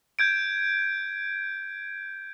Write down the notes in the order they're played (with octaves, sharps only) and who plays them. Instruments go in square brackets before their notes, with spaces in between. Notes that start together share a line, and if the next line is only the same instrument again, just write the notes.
[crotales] G6 G#6 D7